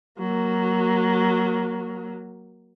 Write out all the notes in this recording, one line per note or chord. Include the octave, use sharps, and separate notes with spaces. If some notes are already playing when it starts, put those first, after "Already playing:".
F#3 A#3